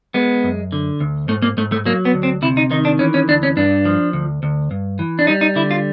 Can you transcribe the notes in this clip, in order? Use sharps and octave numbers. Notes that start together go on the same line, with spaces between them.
G#3 B3
F#2
D3
D2
G#2 A3
A#3
G#2 A3
A3
F#3 A#3
B3
D2
C4
C3 E4
D#4
D#3 D#4
D4
E3 C#4
C#4
D2 D4
C#4
G2 D4
F3
D2
D2
G2
E3
D4
G3 D#4
D#4
D3 E4
F4